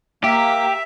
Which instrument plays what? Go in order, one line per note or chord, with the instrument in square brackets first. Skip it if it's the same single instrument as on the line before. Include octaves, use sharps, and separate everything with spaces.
[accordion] A#3 [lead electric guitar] G4 [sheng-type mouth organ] E5